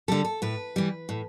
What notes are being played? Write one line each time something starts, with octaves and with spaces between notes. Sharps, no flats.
D3 G3 A4
A4
A2 B4
E3 G3
A2